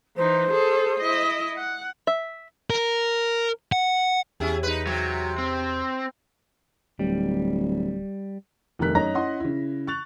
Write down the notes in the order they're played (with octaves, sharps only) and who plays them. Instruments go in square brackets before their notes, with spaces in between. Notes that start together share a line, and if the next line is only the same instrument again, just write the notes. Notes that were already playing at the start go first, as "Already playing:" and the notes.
[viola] E3 D#4 [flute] C5
[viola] G#4 A4
E4 D#5
F#5
[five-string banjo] E5
[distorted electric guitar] A#4
F#5
[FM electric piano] E2 G4 [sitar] C#4 E4 G#4
[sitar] D#4 B4
[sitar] C3 [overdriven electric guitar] F#3
[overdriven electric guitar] C4
[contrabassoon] D1 [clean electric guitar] G3
[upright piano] F1 D#3 G3 A#4 F#6 B6
F#2 D#4 C#5 A#5 A#6
C#4 E4 D#5 F#5 C6
C#3 E4
C#6 F#6 A6 F7